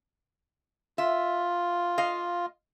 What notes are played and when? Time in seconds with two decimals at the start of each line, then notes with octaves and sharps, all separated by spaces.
0.98 F4 E5
1.98 D#5 F5